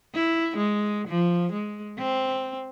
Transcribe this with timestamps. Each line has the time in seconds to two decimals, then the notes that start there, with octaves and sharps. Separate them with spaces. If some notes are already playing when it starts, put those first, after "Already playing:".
0.15 E4
0.57 G#3
1.08 F3
1.53 G#3
1.99 C4